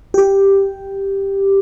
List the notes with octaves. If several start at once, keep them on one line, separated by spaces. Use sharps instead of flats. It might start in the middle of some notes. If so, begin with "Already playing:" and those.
G4